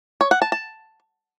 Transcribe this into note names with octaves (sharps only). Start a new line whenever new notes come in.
C#5
F#5
A5
A5